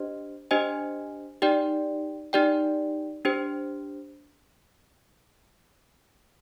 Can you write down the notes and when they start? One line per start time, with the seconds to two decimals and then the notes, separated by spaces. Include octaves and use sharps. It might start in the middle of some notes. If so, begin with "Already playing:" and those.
Already playing: D4 G4 C5 D#5
0.51 D4 G4 C5 D#5 G#5
1.42 D#4 G4 D5 G5
2.33 D#4 G4 D5 G5
3.25 D4 G4 C5